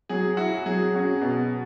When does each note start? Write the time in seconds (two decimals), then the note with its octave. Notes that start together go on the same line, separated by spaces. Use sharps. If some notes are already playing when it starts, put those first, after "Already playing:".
0.09 F#3 G#4
0.37 E4 F#4
0.66 F#3 G#4
0.94 C#4 F#4
1.22 B2